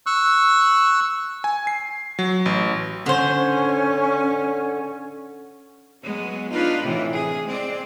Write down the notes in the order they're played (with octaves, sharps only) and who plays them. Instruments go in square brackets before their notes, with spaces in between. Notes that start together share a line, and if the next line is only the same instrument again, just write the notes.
[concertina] C#6 E6 F#6
[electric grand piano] G#5
C7
F#3
A1
[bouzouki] D3 C5 [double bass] C#4
[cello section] F#3 G#3 B3
D4 D#4 F4 B4
A2 C3 E3
G#4
G#3 C4 D5